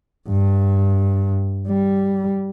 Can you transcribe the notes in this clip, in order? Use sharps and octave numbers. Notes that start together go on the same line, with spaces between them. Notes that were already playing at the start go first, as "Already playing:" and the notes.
G2
G3